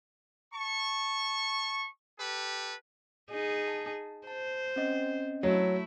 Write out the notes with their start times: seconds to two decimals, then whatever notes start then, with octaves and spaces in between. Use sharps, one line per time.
0.53 A5 C#6
2.19 G4 A4 B4
3.31 D#4 G#4
3.68 A5
4.27 C5 A5
4.76 C4 C#4 D#5
5.43 F#3 A3 E4